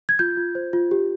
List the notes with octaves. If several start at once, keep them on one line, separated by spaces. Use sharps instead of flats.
G#6
F4 G6
F4
C5
F4
G4